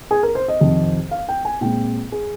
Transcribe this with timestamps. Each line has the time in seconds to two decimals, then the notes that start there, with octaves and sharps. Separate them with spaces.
0.11 G#4
0.23 A#4
0.35 C5
0.48 D#5
0.60 F2 C3 D#3
1.11 F5
1.29 G5
1.45 G#5
1.61 A#2 G#3 C4 G5
2.12 G#4